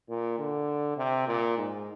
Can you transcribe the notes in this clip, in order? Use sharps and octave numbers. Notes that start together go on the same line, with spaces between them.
A#2
D3
C3
A#2
G#2